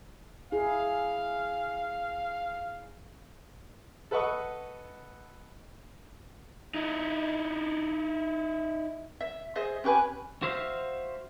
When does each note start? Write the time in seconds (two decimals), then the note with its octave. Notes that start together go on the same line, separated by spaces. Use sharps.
0.52 E4 G#4 F5
4.11 A4 B4 D#5 F#5 C#6 D#6
6.74 D#4 E4
9.21 E5
9.55 G#4 C5 D#5 E5
9.84 C#4 G4 B4 G#5
10.42 F#4 C5 E5 F5